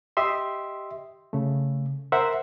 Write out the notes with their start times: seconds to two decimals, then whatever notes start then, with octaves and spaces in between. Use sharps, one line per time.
0.17 G4 D#5 E5 C6
1.33 C#3 A3
2.12 A#4 C5 E5 F#5